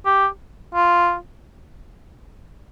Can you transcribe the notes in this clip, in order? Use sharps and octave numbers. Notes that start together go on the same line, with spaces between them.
G4
F4